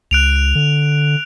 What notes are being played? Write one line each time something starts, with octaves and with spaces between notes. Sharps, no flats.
C#2 F#6 D7 F7
D3